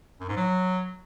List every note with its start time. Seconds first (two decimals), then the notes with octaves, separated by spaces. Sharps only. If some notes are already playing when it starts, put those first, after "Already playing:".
0.20 F#2
0.28 G#2
0.36 F#3